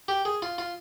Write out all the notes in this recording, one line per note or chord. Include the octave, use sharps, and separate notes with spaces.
G4
G#4
F4
F4